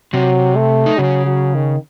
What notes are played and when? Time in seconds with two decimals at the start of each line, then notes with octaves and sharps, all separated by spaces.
0.13 C3 F#3 C4
0.56 A3
0.86 D#4
0.98 C#3 F#3 C#4
1.26 F#3
1.55 D#3